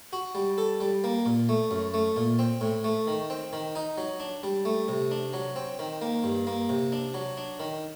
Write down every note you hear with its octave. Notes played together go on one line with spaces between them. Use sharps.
F#4
G3
A4
G3
A#3
A#2
A3
F#2
A3
A#2
C4
A2
A3
D#3
C4
D#3
D#4
F#3
D4
G3
A3
C3
D4
F#3
C4
D#3
A#3
G2
A#3
C3
D4
F#3
D4
D#3